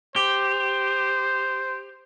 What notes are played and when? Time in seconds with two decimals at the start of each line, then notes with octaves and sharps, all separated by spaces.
0.16 G4 C5